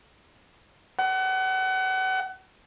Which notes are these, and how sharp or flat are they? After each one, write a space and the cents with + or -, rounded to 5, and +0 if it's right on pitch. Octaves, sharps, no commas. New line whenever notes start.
F#5 +35